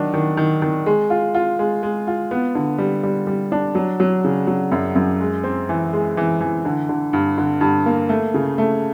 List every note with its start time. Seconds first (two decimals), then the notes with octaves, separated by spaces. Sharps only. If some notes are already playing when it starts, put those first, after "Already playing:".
Already playing: D#3 F#3 D4
0.14 D#3
0.37 D#3
0.62 D#3
0.86 G#3
1.10 F4
1.34 F4
1.59 G#3
1.83 G#3
2.07 F4
2.31 B3
2.55 D3
2.78 G3
3.03 G3
3.27 G3
3.52 D4
3.75 F#3
4.00 F#3
4.24 C#3
4.47 F#3
4.72 F#2
4.95 F#2
5.20 G#3
5.44 C4
5.69 E3
5.93 G#3
6.17 E3
6.41 E3
6.65 D3
6.89 D3
7.13 G2
7.38 D3
7.61 G2
7.86 A#3
8.09 A3
8.34 C#3
8.58 A3